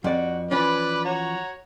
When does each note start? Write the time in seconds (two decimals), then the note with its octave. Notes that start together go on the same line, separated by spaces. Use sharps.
0.04 F2 F#4 D5
0.51 E3 F3 C#4 B4 D5 B5
1.05 F#4 C#5 A#5